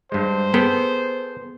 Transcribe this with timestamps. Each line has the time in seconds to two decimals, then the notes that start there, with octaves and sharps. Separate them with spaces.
0.12 G2 G#3 C5
0.54 B3 G#4 A4 G5